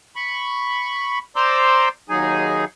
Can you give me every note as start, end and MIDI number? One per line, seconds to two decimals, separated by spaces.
0.16 1.19 83
0.16 1.19 85
1.36 1.89 72
1.36 1.89 74
1.36 1.89 82
1.36 1.89 84
1.36 1.89 86
1.36 1.89 88
2.09 2.65 39
2.09 2.65 54
2.09 2.65 63
2.09 2.65 68
2.09 2.65 80